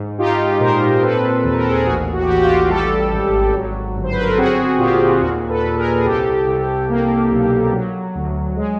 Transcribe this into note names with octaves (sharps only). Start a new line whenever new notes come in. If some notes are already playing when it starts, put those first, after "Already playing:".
Already playing: G#2
D#4 F4 G4
A#2 A#4 C5
C4 A4 B4
D#2 B4
A#4
A4
G#4 A#4
A1 F#4 G#4
F#4
G4
A1 F#4
F4 G4
G3 G4 A4
G#1
F#3
G1
C5
B4
A#4
A4
C4 F#4 G#4
A#2 F4 G4
D#2 F#4
A4 B4
D#2
G#4 A#4
G#4
C2 G4 A4
C2
A#3
B1
F#3
D2
G#3